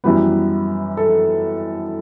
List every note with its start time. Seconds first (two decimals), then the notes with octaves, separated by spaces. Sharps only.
0.04 F#2 E3 G3 B3 B4
0.97 A4